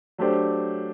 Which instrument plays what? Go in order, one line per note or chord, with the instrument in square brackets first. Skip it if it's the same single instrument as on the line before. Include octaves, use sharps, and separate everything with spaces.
[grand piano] F#3 A3 D4 G4 C5